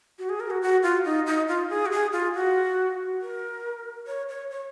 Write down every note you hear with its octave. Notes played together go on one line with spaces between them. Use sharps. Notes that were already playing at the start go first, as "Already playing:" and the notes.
F#4
G#4
A#4
F#4
F#4
F4
D#4
D#4
F4
G#4
F#4
G#4
F4
F#4
A#4
C#5
C#5
C#5